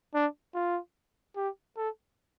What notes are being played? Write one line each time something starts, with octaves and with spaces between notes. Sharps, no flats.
D4
F4
G4
A4